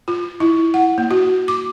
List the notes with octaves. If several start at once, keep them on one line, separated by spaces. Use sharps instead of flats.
F4
E4
F#5
A#3
F#4
D6